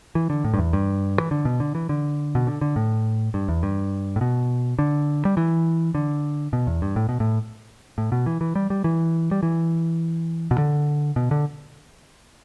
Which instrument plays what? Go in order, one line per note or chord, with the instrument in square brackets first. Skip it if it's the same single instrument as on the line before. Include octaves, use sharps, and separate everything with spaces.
[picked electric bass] E3
D3
A2
G2
E2
G2
E3
D3
B2
D3
E3
D3
B2
D3
D3
A2
G2
E2
G2
A2
B2
D3
G3
E3
D3
B2
E2
G2
A2
B2
A2
A2
B2
E3
E3
G3
G3
E3
G3
E3
B2
D3
B2
D3